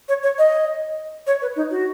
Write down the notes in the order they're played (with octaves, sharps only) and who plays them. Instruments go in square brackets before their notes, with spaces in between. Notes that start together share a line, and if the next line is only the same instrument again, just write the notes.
[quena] C#5
C#5
D#5
C#5
B4
D#4
F#4